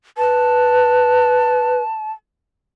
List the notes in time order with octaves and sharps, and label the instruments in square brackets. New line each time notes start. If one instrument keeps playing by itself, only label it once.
[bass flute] B4 [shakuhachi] A5